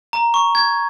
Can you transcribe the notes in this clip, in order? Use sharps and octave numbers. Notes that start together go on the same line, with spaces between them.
A#5
C#6
G#6